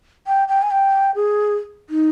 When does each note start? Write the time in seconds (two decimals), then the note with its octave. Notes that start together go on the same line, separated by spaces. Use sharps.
0.27 G5
0.48 G5
0.62 G#5
0.71 G5
1.15 G#4
1.90 D#4